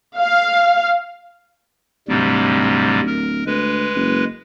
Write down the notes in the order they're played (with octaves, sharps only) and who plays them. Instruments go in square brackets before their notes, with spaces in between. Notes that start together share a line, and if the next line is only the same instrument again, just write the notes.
[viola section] F5
[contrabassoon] D1 [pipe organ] G#2 C3 G3
[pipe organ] A#4
[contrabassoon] D2 [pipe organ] G#3 B4
[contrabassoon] F#1